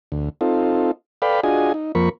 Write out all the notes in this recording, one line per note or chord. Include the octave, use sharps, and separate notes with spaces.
D2
C4 D#4 F4 A4
A4 B4 D5 F5 G5 B5
D4 F4 F#4 G#4 D#5 G#5
D#4
F2 F3 A#3 A#4 B5 C#6